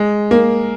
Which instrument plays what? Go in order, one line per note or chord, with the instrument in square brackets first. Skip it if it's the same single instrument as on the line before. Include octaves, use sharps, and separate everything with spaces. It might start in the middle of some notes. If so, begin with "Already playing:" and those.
Already playing: [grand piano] G#3
A#3